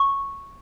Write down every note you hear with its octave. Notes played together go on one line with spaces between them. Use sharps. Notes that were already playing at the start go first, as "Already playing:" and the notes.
Already playing: C#6